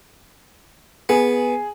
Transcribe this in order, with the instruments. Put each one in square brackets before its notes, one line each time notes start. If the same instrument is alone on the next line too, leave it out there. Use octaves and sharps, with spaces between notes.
[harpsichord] B3 [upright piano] G#4